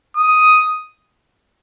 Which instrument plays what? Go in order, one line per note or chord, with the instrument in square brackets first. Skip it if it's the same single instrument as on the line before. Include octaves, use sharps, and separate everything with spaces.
[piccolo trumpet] D#6